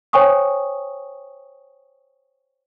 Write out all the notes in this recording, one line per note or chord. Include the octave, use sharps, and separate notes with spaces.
C5 C#5 G5 G#5 C#6 D#6